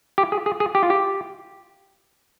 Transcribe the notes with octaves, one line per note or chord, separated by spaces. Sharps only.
G4
G#4
G#4
G#4
G4
F4
G4